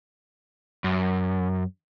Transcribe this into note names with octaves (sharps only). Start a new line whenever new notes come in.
F#2